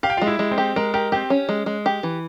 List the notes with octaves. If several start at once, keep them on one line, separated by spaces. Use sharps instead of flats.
G4 F5
G5
F4 F5
G#3
E4 E5
G#3
C4 C5
G4
G#3 A#4
G4 A#4
C4 G4 C5
C#4
G#3
G#3
G4
E3